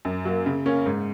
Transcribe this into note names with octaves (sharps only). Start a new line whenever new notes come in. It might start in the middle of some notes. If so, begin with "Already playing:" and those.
F#2
F#3 A#3
C#3
A#3 C#4
G#2